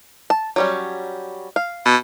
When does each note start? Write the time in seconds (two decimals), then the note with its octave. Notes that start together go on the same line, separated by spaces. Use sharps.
0.30 A5
0.56 F#3 G3 C#4
1.56 F5
1.85 B2